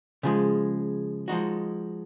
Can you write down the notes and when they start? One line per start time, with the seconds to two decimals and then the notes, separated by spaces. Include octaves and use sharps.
0.23 C#3 F3 G#3
1.28 F3 G#3 D#4 F#4